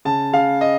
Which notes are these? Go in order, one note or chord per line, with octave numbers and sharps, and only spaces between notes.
C#3 A5
C#3 F5
D#5